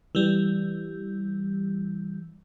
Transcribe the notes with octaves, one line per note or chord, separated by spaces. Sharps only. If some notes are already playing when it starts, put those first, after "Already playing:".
E3 G3